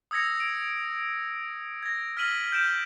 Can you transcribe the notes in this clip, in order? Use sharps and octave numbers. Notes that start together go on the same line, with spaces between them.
D#6 E6 G#6 A#6 C#7
D7
G#6 A#6
F6 A#6 B6 D#7 F#7 G7
G6 D7 E7